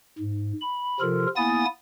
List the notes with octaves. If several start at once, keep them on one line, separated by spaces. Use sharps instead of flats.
G#2
B5
C3 F3 F4 A4 A#4
A#3 B3 E4 G#5 D#6 A6